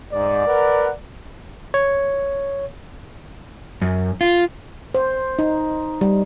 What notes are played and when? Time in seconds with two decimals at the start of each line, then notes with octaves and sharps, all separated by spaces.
0.13 G#2 D5
0.47 A#4 B4 F#5
1.74 C#5
3.82 F#2
4.21 F4
4.95 C5
5.39 D#4
6.01 G3